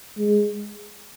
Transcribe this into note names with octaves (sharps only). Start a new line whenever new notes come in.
G#3